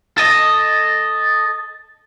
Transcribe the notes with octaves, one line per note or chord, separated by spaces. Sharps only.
A4 D#5